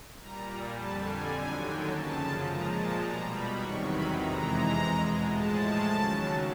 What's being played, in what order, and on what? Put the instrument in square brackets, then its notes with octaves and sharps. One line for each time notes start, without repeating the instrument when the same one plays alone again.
[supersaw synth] A#2 G3 A#5
F2 D3 G3 A5
G#5
D#2 D3 F#3 G#5
G5
F#2 C#3 F3 A5
A#2 F3 G#3 A#5
A5
B2 G3 A#5
B5
E2 C3 D#3 F#3 C#6
B5
F2 C3 E3 G#3 A#5
E2 B2 G#3
A2 F3 G#3 A5
D#2 C#3 F#3